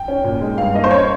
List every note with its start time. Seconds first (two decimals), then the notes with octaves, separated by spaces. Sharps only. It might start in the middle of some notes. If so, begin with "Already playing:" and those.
Already playing: G5
0.08 C#4
0.24 A#2
0.41 G#3
0.58 G2 F5
0.74 A#3 D#5
0.84 C5
0.91 C#4 C#5